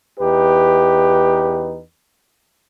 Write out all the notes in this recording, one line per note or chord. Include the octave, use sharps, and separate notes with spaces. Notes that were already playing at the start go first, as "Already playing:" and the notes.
E2 D#4 G4 B4